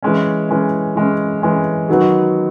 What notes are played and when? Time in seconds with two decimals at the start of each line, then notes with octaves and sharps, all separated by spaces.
0.03 E3 G#3 C#4
0.49 E3 G#3 C#4
0.96 E3 G#3 C#4
1.42 E3 G#3 C#4
1.88 D#3 F#3 B3 D#4 F#4